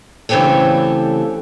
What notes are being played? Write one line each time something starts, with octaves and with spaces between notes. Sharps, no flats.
C#3 E3 A3 C4 G4 A4